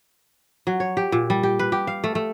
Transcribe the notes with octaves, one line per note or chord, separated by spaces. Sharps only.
F#3
C#5
G4
A#2
G3
G4
B4
G4
F5
A3
A3